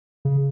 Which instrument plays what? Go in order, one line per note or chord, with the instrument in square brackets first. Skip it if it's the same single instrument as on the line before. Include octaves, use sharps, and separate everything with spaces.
[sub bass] C#3